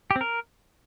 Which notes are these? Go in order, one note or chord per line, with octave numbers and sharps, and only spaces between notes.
G4
C4
A#4